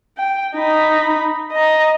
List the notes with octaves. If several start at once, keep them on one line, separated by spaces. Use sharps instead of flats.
G5
D#4 B5
D#5 A#5